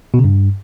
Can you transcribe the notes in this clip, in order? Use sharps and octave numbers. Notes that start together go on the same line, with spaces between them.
B2
C#3
G2